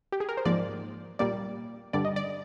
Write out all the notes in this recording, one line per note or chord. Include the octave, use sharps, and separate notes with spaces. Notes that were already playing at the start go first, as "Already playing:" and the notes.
G4
G#4
A#4
C5
G#2 F3 A#3 D5
A#2 G3 A#3 D5
G2 D3 G3 D5
D#5
D5